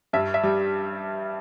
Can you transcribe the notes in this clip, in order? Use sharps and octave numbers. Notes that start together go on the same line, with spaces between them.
G2 E5
E5
G3